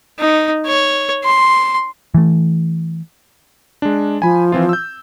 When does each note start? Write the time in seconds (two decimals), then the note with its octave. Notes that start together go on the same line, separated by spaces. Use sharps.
0.18 D#4
0.66 C#5
1.24 C6
2.15 E3 A3
3.82 G#3 D4
4.22 F3 G#5 B5
4.52 E3 C4 F4
4.69 E6 G6